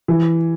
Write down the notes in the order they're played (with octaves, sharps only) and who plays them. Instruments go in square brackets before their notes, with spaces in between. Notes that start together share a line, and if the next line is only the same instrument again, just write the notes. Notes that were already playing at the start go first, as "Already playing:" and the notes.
[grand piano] E3